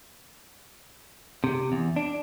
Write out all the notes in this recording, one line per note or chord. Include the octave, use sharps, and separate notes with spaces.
C3
E2
D4